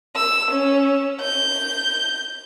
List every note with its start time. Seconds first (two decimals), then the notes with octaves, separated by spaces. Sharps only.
0.16 E6
0.50 C#4
1.21 G6